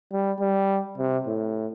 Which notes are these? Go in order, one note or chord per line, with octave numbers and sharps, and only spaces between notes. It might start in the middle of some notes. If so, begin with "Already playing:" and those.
G3
G3
C3
A2